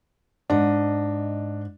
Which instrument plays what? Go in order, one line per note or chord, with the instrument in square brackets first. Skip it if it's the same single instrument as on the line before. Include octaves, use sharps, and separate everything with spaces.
[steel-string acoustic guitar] G#2 D#5 [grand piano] D4